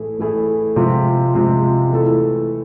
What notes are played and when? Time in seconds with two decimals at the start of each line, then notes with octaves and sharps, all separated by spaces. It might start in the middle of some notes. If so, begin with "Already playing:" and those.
Already playing: A2 E3 A3 E4 G#4
0.19 A2 E3 A3 E4 G#4
0.76 C3 F3 G#3 C4
1.34 C3 F3 G#3 C4
1.92 E3 A3 E4 A4